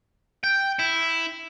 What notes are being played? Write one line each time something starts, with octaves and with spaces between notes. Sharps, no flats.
G5
E4